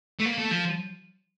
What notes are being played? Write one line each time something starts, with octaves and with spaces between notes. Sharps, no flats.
A3
A#3
A3
F3